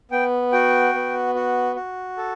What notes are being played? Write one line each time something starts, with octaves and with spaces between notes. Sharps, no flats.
B3 G5
F#4 G5
B3
F#4
F#4
A4